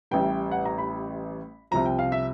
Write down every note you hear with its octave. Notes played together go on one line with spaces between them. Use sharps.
A1 A2 E3 G3 G5
F#5
A#5
B5
C2 C3 F3 A#5
G5
F5
E5